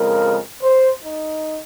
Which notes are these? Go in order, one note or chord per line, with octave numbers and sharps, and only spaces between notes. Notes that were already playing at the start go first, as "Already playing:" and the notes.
Already playing: F2 C#3 G#3 A#4
C5
D#4